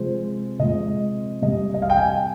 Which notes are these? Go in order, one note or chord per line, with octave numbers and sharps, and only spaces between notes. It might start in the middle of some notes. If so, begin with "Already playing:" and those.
Already playing: C3 F3 G#3 C5
C3 F3 G#3 D#5
C3 G3 D#5
D#5
F5
G5
G#5